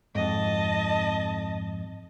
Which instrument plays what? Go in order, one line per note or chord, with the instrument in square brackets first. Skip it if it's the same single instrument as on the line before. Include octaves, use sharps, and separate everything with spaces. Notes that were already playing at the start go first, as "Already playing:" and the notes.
[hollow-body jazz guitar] F2 G#2 [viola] D#5 A5